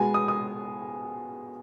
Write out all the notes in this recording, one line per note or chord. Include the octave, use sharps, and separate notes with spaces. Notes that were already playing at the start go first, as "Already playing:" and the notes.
Already playing: B2 G#3 B3 G#5
D#6
D#6